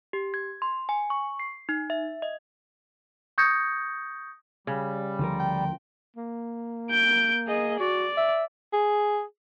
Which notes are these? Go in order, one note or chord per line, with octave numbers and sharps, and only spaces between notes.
G4
G#6
C6
G#5
C#6
C7
D#4
E5
D#5
C#6 D#6 G6 G#6 A#6 C#7
C#3 G3
D2 F3 A#4
G5
A#3
G6 D7
G#4 D#5
F#4 D5
E5
G#4